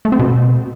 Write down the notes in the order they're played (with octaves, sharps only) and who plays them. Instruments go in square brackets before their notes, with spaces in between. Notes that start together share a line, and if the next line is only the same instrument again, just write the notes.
[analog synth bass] A3
C4
B2